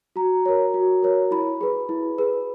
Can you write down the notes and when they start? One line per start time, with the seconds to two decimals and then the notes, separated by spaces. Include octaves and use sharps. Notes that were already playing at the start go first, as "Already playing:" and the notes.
0.16 F#4 A#5
0.46 A#4 C#5
0.74 F#4
1.02 A#4 C#5
1.31 E4 B5
1.61 G#4 B4
1.89 E4
2.18 G#4 B4